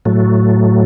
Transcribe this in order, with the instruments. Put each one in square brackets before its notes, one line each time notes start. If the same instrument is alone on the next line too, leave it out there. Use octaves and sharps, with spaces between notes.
[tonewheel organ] A2 F#3 A3